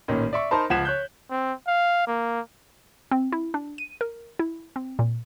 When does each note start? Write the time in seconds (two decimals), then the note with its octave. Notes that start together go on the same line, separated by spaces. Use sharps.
0.08 A1 A#2 D#3 C#4
0.33 D5 E5 C#6
0.51 D#4 A#4 C5 A5 B5
0.70 C#2 F3 F#5 G#6 B6 E7
0.85 C#5 F#6 G6
1.30 C4
1.67 F5
2.07 A#3
3.11 C4
3.32 E4
3.54 D4
3.78 D#7
4.01 A#4
4.39 E4
4.76 C4
4.99 A#2